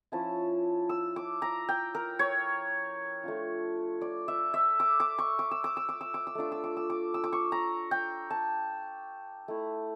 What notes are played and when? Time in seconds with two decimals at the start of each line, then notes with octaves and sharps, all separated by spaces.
0.12 F3 C#4 E4 A5
0.89 E6
1.16 D6
1.42 A#5
1.69 G5
1.95 A#4
2.19 C#5
3.24 A3 D4 F4
4.01 D5
4.28 E5
4.54 E5
4.80 D6
5.00 D6
5.18 C#6
5.39 D6
5.51 E6
5.64 D6
5.77 E6
5.89 D6
6.01 E6
6.14 D6
6.27 E6
6.35 A3 D4 F4 D6
6.52 E6
6.64 D6
6.77 E6
6.90 D6
7.14 E6
7.24 D6
7.33 C#6
7.52 A#5
7.91 G5
8.30 A5
9.48 A3 E4